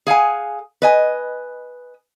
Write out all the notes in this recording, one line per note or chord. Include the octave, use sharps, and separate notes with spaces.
G#4 F5 F#5 G#5
B4 D#5 G#5